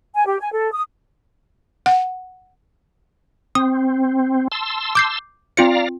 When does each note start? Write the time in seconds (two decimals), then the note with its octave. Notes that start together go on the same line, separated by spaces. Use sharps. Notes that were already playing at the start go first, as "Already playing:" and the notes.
0.15 G#5
0.26 G4
0.40 G#5
0.52 A4
0.72 D#6
1.86 F#5
3.55 C4 D#6
4.52 A5 C6 E6
4.95 D6 G6 C7
5.57 C4 F4 D5 F5 A#5 C#7